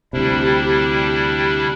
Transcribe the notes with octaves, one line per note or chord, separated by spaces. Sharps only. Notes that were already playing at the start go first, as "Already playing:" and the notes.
D2 C3 G3 D4 E4 G4